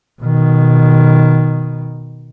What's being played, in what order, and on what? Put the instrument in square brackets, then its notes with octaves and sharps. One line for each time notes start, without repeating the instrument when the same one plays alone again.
[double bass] B2 D#3